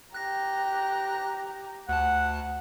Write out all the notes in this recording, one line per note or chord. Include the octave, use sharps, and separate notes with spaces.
G4 A#5 F#6 A#6
D2 F#5 A5